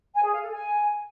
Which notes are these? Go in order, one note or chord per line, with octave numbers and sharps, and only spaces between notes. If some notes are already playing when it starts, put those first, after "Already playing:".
G#5
G#4
F5
A4
G#5